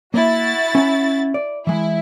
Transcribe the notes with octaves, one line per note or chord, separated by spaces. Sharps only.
A#3 E4 F#4 A6
C#4 F#5 A#5
D5
E3 G#3 E4